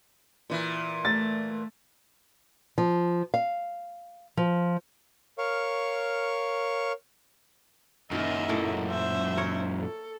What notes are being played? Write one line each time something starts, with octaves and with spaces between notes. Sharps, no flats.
A#2 E3
A3 A6
F3
F5
F3
A#4 C#5 F5 C#6
F#2 A#2 D#3 A#4 D#5 E5
A2 A3 A#3
C5 E5
A#4 C#5
A4